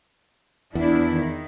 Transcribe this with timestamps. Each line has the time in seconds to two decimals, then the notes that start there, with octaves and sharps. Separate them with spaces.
0.75 E2 D4 E4
1.10 D#3